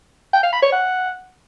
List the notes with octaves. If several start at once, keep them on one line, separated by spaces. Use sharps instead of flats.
G5
F5
B5
C#5
F#5